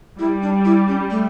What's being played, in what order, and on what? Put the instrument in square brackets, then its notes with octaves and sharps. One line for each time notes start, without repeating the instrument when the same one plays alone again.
[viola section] G3 [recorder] E4
[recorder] D4
E4
C#4
A3